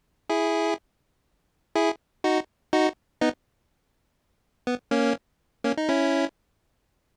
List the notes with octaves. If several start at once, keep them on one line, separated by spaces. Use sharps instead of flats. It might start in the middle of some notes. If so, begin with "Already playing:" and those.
E4 G#4
E4 G#4
D#4 F#4
D#4 F#4
B3 D#4
B3
A#3 C#4
A#3 C#4
D#4
C#4 E4